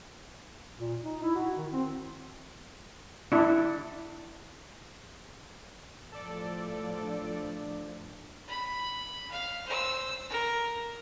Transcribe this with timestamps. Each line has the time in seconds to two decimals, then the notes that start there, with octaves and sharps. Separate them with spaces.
0.79 A#2
1.04 D#4
1.23 E4
1.35 F#4
1.57 D#3
1.73 C4
3.32 D4 E4
6.12 A2 F3 A4 D5
7.02 D4
8.48 B5
9.31 F5
9.66 C5 E6
10.30 A#4